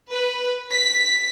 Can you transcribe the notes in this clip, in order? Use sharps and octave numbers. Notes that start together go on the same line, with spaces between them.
B4
B6